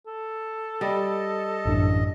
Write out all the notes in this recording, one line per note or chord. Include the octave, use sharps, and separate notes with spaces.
A4
G3 D#5
A1 F#2 D4